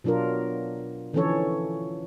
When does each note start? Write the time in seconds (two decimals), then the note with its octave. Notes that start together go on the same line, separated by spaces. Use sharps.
0.04 B2 F#3 D4 F4 A#4
1.13 D3 E3 F3 C#4 A4 C#5